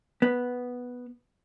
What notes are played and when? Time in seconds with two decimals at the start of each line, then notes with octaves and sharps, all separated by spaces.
0.22 B3